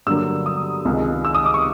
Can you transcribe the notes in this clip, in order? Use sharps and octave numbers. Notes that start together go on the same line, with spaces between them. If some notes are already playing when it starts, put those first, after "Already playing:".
G2 D3 F#3 A#3 E6
D#6
C#2 C3 D#3 G#3
E6
D#6
D6
C#6